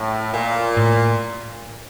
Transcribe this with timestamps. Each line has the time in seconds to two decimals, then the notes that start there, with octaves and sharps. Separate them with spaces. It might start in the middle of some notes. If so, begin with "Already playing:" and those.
Already playing: A2
0.34 A#2
0.77 A2